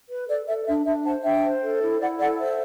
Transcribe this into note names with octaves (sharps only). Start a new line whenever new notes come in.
B4
A4 D5
A4 E5
D5
D4 E5
D4 E5
C5 F#5 A5
D4 E5 G5
C5
A4
E4
E4 D5 F#5
A4 D5 F#5
C5 E5